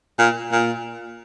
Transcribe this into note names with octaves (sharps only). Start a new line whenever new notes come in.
A#2
A#2